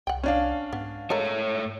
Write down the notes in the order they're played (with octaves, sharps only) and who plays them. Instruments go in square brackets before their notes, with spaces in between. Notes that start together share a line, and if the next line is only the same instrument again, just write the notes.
[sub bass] C2 [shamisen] F#5 G5
[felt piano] C#4 D4 F5
[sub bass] G#2 [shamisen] B3
[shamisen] G#3 A4 A#4 [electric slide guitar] A3 C#5